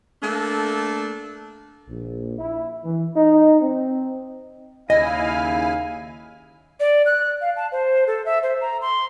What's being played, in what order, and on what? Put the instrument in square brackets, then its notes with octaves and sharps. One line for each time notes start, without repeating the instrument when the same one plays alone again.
[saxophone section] A3 A#3 D4 A4
[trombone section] A#1
E4
E3
D#4
C4
[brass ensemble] D#2 F5 [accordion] C#3 E4 G#5 [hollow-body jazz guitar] D#5
[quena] D5
F#6
F5
A5
C5
A4
E5
C5
A#5
C6